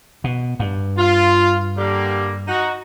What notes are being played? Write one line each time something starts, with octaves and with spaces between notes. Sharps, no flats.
B2
G2
F4
D3 G3 A#3
D#4 F#4